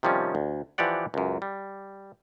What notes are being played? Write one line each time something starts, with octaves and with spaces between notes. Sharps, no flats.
C3 D#3 F3 G3 C#4
D2
E3 F3 G4 D5 F#5
C#2 F#2
G3